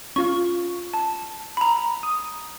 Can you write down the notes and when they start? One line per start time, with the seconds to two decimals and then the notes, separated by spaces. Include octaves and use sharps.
0.16 C#4 F4 F5 C#6
0.94 A5
1.57 A#5 B5
2.03 D#6